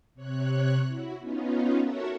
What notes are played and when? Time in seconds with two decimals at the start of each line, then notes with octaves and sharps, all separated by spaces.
0.15 C3 C#5 F#6
0.88 E4 F#4
1.19 B3 C#4 D#4 F4
1.79 F#4 A4 A#4 C#5 E5 F#5